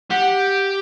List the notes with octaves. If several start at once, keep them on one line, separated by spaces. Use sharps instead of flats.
G4 F#5